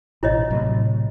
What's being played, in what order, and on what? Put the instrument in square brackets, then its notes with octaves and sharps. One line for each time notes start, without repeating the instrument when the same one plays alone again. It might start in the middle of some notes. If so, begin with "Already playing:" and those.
[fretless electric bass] A1 B2 [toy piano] E4 C#5 D#5
[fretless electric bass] A2 C3 F#3